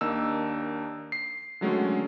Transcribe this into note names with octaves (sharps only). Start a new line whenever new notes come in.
D#2 A#3 D4 D#4 E6
C7
D3 D#3 F#3 G#3 A3 C#4